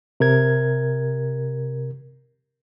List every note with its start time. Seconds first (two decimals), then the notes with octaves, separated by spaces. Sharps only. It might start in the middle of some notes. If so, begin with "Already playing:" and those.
0.20 C3 A#4 G#6